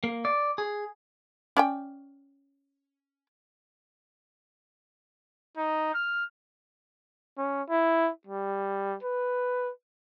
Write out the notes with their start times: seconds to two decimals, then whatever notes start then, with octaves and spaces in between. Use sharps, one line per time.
0.04 A#3
0.25 D5
0.58 G#4
1.57 C#4 D5 G5
5.57 D#4
5.94 F6
7.38 C#4
7.70 E4
8.27 G3
9.03 B4